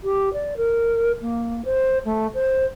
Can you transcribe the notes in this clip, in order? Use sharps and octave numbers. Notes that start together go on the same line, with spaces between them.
G4
D5
A#4
A#3
C5
A3
C5